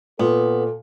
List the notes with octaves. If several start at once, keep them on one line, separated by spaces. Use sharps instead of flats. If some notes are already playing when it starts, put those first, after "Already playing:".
A#2 B3 A4